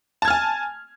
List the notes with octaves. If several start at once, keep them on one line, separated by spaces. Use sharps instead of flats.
G#5 A5 F6 G#6